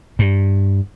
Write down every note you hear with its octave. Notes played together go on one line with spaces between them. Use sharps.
G2